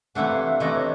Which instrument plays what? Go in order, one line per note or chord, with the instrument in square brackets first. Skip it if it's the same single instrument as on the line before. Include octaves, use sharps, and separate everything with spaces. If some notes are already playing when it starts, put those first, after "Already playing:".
[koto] C3 E3 A3 D4 [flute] F#5
[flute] F5
E5
[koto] C3 E3 A3 D4 [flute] D#5
[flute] C#5